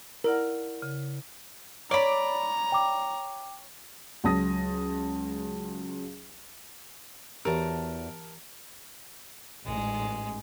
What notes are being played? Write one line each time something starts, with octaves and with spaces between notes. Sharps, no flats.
E4 A#4 D5 F#5
C#3
C#5 D5 A#5 B5
G5 D6
C#2 F#3 A5 D#6 A#6
E2 E3 F#4 G4 A#4 A5
A1 G#2 G#3